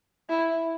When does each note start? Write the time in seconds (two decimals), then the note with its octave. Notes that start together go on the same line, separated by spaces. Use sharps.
0.29 E4